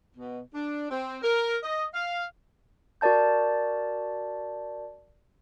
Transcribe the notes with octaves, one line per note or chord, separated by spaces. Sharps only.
B2
D4
C4
A#4
D#5
F5
F#4 A#4 D5 A5 G6